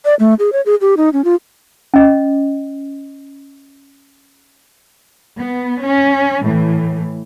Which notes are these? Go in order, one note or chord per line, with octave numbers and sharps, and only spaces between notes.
D5
A3
G#4
C#5
G#4
G4
D#4
C#4
F4
C#4 D#5
B3
C#4
A2 E3